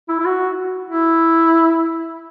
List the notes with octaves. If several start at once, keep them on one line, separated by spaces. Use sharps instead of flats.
E4
E4
F#4
E4